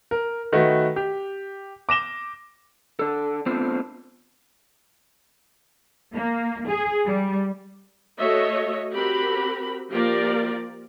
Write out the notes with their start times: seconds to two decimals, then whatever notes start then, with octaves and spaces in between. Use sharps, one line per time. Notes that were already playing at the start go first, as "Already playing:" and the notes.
0.11 A#4
0.52 D#3 A3 F#4 B4
0.96 G4
1.89 D6 A#6 E7 G7
2.99 D4 A4
3.46 A3 B3 C4 D4 F4 C5
6.15 A#3
6.69 G#4
7.06 G3
8.19 A3 F#4 C#5 D#5 E5
8.94 C4 F#4 G4 A#4 B5
9.92 F3 A#3 F4 G4 A#4 D5